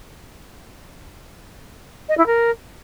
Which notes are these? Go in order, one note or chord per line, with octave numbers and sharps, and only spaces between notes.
D#5
E4
A#4